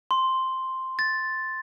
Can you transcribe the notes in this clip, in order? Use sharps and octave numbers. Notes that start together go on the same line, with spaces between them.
C6
A6